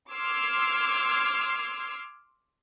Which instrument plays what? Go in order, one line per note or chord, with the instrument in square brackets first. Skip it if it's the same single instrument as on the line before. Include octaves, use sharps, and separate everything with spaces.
[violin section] C6 D6 E6 F6 G#6 C7